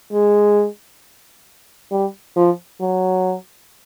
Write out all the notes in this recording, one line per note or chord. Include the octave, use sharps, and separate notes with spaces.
G#3
G3
F3
F#3